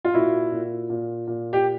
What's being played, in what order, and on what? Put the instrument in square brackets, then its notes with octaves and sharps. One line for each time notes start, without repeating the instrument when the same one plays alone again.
[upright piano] F4
A#2 E4 F#4
A#2
A#2
A#2
G4